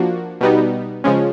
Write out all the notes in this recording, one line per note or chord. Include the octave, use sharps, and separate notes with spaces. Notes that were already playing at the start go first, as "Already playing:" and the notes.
Already playing: F3 A#3 D4 F#4
B2 G3 B3 D#4
C#3 F3 G#3 C#4